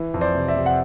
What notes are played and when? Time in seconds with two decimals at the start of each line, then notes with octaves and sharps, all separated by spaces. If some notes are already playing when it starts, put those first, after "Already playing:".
Already playing: E3
0.14 F2
0.21 C5 D5
0.35 C3
0.48 D5 E5
0.56 C3
0.66 F#5